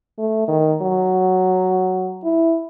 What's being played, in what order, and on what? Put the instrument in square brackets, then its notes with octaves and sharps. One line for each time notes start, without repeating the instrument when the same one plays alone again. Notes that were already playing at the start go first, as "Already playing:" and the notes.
[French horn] A3
D#3
F#3
E4